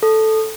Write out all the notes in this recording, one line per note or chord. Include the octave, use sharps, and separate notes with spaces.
A4